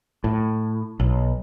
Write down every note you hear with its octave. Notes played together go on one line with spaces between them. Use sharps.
A2
B1